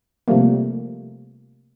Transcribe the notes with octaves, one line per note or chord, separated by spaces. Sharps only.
C3 F3 G3 A3 A#3